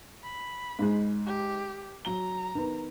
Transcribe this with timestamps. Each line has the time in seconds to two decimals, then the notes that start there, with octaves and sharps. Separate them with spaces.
0.24 B5
0.79 G#2 G#3
1.26 G4
2.05 F#3 A#5 G7
2.55 D#3 B3